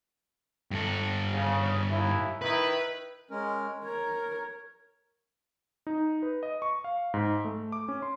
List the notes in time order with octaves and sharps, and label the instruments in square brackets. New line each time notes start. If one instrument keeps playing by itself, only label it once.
[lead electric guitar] G2 A4
[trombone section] C#3
D#2 E4
[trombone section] D#3 E4 [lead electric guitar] B4
[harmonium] G#3 C#4 A#4
[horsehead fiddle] A#4 [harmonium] C#5
[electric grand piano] D#4
B4
D#5
C#6
F5
G#2
A3
D6
C#4
C6